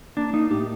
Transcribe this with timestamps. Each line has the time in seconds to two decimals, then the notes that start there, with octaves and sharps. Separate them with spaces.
0.17 A#3 D4
0.33 A#3 D#4
0.50 A2 G4